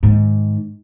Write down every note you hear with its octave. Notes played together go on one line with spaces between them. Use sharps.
G#2 D#3